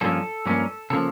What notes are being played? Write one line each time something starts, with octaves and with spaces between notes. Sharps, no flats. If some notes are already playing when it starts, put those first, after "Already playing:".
G2 F3 A#3 C#4 A4
G2 F3 A#3 C#4
C#3 F3 A#3 A4